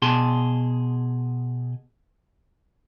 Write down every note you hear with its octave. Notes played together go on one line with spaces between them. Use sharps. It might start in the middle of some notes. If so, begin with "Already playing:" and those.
B2 G#4 A5 C6